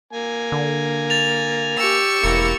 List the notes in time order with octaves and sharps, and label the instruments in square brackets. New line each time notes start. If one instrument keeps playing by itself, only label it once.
[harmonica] A#3 G#5
[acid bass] D3
[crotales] A6 F7
[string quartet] G4 C#6 E6
[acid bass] E1 [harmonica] A#3 E4 [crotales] C#7